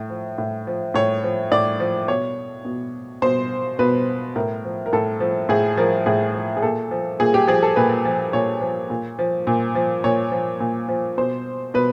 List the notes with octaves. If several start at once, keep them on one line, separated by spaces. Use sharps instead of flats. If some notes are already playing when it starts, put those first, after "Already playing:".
Already playing: A2
F3
A2
F3
A2 C#5
F3
A2 D5
F3
B2 C#5
B2
B2 C5
B2 B4
A2 A#4
F3
A#4
A2 A4
F3
A2 G#4
F3 A#4
A2 G#4
F3
G#4
A#2 A4
F3
A#2 G#4
G4
F3 G#4
A4
A#2 B4
F3
A#2 C#5
F3
A#2
F3
A#2
F3
A#2 C#5
F3
A#2
F3
B2 C5
B2 B4